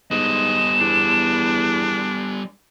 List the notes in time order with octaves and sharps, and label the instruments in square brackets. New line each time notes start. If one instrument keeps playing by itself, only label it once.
[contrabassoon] G#2 [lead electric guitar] G3 B3 [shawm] D#5 [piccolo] E7
[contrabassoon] E2 [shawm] D4